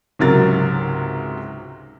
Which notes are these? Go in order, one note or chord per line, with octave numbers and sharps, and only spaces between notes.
C#2 G#2 C3 F#3 A#4 A6